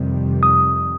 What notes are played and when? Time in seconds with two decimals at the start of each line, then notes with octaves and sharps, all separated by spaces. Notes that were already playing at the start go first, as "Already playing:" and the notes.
Already playing: F2 C3 D#3 G3
0.43 D#6